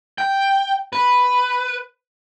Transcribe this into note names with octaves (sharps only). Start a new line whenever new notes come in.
G5
B4